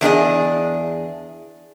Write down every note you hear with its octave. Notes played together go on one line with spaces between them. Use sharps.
E2 D4 G#4 D#5